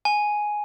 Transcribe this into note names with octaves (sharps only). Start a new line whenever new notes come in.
G#5